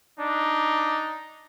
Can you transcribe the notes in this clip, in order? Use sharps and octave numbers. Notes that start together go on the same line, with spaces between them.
D4 D#4